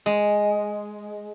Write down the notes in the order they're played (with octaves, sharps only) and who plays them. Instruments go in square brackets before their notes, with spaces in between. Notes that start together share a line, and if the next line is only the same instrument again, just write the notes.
[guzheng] G#3